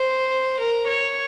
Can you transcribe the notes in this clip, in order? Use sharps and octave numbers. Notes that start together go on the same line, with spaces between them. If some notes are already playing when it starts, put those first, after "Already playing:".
Already playing: C5
A#4
C#5